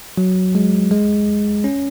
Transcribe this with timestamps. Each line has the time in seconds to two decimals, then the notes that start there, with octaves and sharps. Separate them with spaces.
0.18 F#3
0.55 G#3
0.91 G#3
1.64 C#4